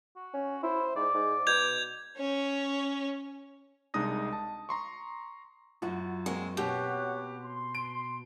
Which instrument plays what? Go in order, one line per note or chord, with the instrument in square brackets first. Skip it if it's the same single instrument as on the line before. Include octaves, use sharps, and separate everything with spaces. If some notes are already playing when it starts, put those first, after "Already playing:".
[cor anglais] F#4
[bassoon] C#4
[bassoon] E4 [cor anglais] C5
[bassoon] G#2 [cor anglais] D5
[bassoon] G#2
[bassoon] B2 [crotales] G6 G#6 F7
[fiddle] C#4 C#5
[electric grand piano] C2 G#3 D4 D#4 D#6 A#6
A5
A#5 C6 C#6
[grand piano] F#2 [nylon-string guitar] F4 F#4
[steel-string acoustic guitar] G#3 [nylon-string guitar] A#3 C4 F#4
[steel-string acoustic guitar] B2 [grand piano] G4 [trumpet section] C#5 F#5
[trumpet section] C6
[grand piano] D7